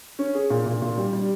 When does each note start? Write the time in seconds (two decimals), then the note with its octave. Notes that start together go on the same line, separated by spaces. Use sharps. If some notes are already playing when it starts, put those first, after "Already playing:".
0.19 C#4
0.35 G#4
0.50 A#2
0.66 A#2
0.82 A#2
0.98 G3
1.13 G3